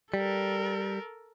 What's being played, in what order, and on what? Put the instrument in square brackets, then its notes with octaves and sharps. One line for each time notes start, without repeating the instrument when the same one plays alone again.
[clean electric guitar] G3 [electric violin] A4 A#4